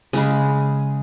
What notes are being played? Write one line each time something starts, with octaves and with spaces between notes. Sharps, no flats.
C#3 G#3 B5